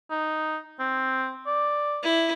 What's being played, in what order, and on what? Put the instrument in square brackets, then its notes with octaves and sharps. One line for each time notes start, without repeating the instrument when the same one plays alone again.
[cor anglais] D#4
C4
D5
[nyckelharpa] E4